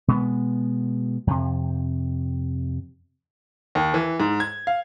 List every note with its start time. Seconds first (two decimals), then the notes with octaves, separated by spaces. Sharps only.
0.08 B2 G#3 B3
1.27 F2 C3
3.75 D#2
3.94 E3
4.20 G#2
4.40 G#6
4.67 F5